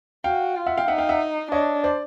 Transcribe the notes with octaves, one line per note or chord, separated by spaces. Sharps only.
F#4 F5 G5
F4
E5 F#5
F5 G5
D#4 E5 F#5
F5 G5
E5 F#5
D4 C#5 D#5
C5 D5